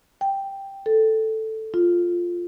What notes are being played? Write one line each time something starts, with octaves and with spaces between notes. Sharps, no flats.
G5
A4
F4